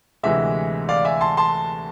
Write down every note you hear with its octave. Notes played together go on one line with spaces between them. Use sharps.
D2 C3 E3 G#3 E5
D5 F5
E5 G#5
A5 C6
A5 C6